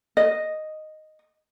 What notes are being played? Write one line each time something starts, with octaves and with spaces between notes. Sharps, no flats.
D#5